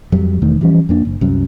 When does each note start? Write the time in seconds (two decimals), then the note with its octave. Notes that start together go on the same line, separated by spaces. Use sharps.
0.12 F2 F#3 G3
0.42 E1 E2 D#3 A3
0.61 E3 F3 G3 C#4
0.89 F2 A#3 D4
1.05 F#1
1.21 C2 F#2